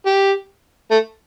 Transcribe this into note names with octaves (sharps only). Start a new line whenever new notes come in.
G4
A3